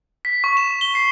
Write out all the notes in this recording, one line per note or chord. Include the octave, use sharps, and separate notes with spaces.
B6
C#6
E7
G7
C7